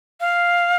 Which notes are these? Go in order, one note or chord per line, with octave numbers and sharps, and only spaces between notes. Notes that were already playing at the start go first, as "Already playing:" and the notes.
F5